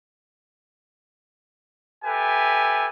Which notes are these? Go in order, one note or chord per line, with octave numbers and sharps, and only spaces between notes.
G4 A4 B4 E5 G#5